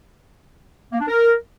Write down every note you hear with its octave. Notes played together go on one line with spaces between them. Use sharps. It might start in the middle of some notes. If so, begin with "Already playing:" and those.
A#3
D4
A#4